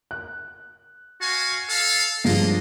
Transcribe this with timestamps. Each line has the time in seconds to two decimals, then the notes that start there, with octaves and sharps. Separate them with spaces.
0.11 F#6
1.21 F#4 F5 G#5
1.69 A4 F5
2.24 G2 F3 G#3 A#3 D4 D#5